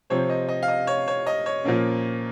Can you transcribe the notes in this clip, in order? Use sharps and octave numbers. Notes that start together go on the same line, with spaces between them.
C3 F3 C4 C#5
D#5
D#5
F5
D#5
C#5
C#5
D#5
C#5
A#2 F3 A#3 C#4